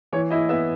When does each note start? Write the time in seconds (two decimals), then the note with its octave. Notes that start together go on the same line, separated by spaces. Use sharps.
0.12 E3 C#5
0.30 E4 D#5
0.49 B3 E5